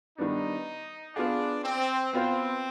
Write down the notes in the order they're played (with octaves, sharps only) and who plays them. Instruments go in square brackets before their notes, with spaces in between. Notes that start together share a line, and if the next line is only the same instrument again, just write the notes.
[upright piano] D#3 G3 B3 D4 [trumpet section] D#4
[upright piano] B3 F4 G#4 [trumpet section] D4
[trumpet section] C4
[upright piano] B3 F4 C5 [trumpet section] C4